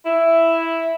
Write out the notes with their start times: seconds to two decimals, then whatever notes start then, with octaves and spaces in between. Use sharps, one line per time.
0.05 E4